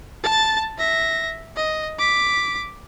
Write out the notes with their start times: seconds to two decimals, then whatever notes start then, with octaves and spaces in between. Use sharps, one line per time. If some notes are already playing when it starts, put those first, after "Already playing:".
0.23 A5 A6
0.78 E5 A#6
1.56 D#5
1.99 D6 B6